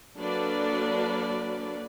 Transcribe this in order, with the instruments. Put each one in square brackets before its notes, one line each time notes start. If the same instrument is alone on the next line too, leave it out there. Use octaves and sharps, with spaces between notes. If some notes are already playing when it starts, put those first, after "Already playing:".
[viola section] F#3 A#3 D4 A4 B4 D5